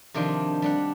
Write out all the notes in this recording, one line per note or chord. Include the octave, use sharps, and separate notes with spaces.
C3 D#3 F3 D4 C5
G3 D4 F#5